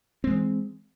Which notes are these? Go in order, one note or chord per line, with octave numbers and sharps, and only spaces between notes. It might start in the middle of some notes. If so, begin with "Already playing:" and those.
E3 G#3 C4